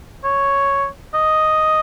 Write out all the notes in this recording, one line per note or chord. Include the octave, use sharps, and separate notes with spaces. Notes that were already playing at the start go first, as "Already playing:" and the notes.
C#5
D#5